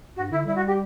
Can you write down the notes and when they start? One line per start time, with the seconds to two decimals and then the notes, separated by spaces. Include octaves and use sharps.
0.16 G2 F#4
0.31 D3 E4
0.46 G3 E4
0.56 F#4
0.66 G4